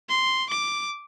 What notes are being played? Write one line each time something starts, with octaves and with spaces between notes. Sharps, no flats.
C6
D6